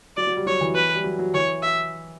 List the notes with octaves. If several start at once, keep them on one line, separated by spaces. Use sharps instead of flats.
F#3 D5
F#3
G3
F#3 C#5
E3
B4
G3
F#3
F#3
E3 C#5
E5